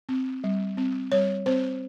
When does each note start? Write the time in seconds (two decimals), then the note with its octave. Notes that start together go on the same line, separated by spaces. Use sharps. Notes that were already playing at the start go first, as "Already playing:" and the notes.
0.09 C4
0.44 G3
0.77 C4
1.12 G3 C#5
1.46 C4 C5